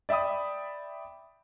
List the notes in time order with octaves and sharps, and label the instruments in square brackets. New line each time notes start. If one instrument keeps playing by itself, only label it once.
[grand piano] D5 E5 G5 B5 D#6